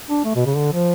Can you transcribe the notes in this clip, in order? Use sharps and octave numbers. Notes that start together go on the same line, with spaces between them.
D4
A3
B2
C#3
D3
F3